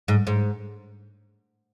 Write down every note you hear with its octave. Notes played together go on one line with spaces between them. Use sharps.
G#2
G#2